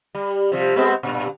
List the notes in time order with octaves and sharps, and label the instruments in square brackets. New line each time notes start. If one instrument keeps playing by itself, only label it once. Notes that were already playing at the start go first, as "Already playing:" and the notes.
[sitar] G3
C3 F3 G3
G#3 B3 C4
G2 A#2